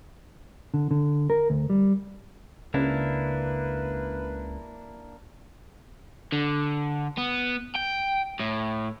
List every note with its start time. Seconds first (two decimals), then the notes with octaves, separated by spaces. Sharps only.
0.74 D3
0.91 D3
1.30 A#4
1.50 D2
1.70 G3
2.74 C#2 A#3 D4 E4 B4
6.32 D3
7.18 B3
7.76 G5
8.40 A2